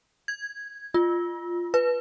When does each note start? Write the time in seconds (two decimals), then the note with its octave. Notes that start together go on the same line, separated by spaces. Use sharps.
0.28 G#6
0.94 F4
1.74 B4